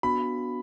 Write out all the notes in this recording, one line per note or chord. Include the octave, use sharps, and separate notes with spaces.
B3 D4 F#4 B5